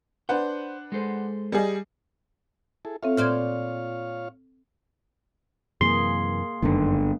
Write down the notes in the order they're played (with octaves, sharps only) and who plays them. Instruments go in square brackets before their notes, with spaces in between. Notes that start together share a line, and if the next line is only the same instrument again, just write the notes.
[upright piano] D4 B4 F#5 [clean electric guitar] C5
[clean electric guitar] G#3 A4 C5
[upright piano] G3 G#4 D#5
[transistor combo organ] E4 G#4 A4
[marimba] C4 A4 E5 [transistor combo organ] F4 C#5 F5
[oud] A#2 C5 D5 [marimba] F6 G#6
[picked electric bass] F#2 C3 E3 [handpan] A#3 G#4 [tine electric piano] C6
[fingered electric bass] G1 D3 [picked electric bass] F#2 D#3 [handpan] G#3 A#3 B3